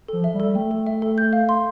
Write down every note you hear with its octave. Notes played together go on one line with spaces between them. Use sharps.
F3 A4
E5
G3
A4
A3 G5
A4
E5
A4
G6
F5
C6